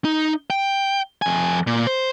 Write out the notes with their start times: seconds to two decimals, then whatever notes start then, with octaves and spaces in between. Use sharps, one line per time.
0.05 D#4
0.50 G5
1.22 F2 G#5
1.67 A#2
1.87 C5